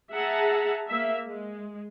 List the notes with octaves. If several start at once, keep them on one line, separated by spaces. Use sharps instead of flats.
G#4 E5 F#5 A5 A#5
A#3 E5
G#3